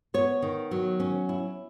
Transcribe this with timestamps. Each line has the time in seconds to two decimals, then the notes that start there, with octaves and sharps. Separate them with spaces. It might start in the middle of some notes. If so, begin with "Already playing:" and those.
0.14 B3 C#5
0.42 D#3
0.71 F#3
1.00 C#4
1.29 E4